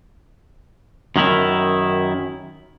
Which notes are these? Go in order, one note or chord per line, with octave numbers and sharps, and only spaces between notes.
F#2 D#3 E4